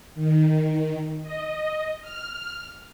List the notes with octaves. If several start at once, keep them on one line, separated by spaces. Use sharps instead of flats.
D#3
D#5
F6